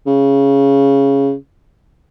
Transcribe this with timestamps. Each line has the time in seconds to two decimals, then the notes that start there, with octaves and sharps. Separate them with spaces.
0.07 C#3